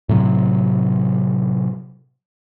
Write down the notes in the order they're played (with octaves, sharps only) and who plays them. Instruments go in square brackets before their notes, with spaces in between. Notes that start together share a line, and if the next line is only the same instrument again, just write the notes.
[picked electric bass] A2 C3 F#3